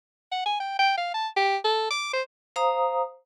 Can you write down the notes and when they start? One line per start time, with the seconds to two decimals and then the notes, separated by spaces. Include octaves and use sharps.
0.32 F#5
0.45 G#5
0.60 G5
0.79 G5
0.97 F5
1.14 A5
1.36 G4
1.64 A4
1.90 D6
2.13 C5
2.56 C5 F5 A#5 D#6